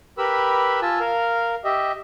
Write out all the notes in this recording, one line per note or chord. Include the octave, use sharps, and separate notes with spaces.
G4 A#4 B4 B5 E6
F4 G#5 A5 E6
A#4 F5
G4 D#5 E5